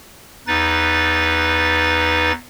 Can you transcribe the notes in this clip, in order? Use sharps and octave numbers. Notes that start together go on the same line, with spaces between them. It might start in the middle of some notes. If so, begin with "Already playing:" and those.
E2 D#4 B4 A6